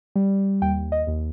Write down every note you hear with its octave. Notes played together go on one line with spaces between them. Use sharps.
G3
D#2 G5
D#5
D#2